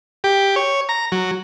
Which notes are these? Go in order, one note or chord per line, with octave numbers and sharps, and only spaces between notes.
G4
C#5
A#5
F#3